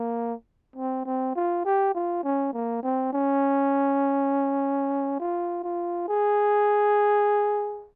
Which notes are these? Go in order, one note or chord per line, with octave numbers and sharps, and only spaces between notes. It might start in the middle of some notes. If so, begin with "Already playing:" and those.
Already playing: A#3
C4
C4
F4
G4
F4
C#4
A#3
C4
C#4
F4
F4
G#4